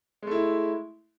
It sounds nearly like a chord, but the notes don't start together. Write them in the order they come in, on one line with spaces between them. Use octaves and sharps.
G#3 A3 E4